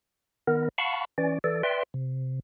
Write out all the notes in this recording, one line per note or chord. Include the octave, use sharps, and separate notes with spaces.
D#3 B3 A#4
F5 F#5 A5 B5 C#6
E3 C#4 D5
E3 A4 D5
B4 D5 E5 G5 C6
C3